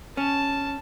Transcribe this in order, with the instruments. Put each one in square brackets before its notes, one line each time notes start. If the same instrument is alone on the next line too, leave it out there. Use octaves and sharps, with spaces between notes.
[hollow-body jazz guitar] C#4 [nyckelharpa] A5